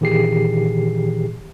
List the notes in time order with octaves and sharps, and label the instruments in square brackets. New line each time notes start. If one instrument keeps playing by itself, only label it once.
[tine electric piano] A#2 D#3 E3 G4 G#4 C7